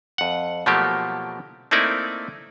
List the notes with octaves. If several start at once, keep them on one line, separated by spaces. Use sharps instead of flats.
F2 F#5
B2 F3 F#3 A3 A#3 G4
A3 A#3 C4 D#4 E4 D5